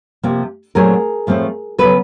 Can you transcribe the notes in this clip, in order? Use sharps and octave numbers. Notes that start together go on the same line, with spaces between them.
C3 F3 A#3
A#2 F#3 A3 C4 G#4 A#4
A2 F3 A3 C4
C#3 F#3 B3 A4 B4